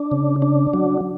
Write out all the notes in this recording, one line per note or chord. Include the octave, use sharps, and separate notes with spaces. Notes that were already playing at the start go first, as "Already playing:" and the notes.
Already playing: D4
C#3
D4
F#3